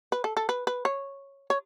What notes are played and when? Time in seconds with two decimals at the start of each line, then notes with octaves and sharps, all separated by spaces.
0.12 B4
0.24 A4
0.37 A4
0.49 B4
0.67 B4
0.85 C#5
1.50 C#5